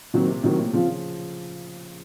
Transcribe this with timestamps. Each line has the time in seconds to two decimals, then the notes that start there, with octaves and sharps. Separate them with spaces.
0.14 A#2 D#3 F#3 C4
0.28 C3
0.43 A2 D#3 F#3 C4
0.59 A#2
0.73 C#3 F3 C4 F4
0.88 F3